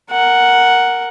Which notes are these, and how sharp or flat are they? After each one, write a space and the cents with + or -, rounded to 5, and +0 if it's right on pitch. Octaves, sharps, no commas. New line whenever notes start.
A#4 +0 F#5 +0